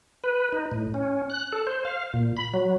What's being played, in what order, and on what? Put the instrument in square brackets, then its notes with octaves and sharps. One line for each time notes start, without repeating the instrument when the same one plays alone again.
[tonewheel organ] B4
D#4
A2
C#4
F#6
A4
C5
F5
A#2
B5
F#3